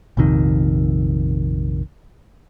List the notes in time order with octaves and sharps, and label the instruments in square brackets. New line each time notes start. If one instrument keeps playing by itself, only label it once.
[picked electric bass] A#1 F2 C3 D#3